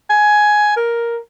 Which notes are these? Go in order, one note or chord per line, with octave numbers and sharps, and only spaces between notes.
G#5
A#4